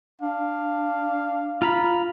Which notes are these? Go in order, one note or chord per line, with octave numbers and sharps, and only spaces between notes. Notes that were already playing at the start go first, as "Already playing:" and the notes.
D4 F5
F4 A#5 B5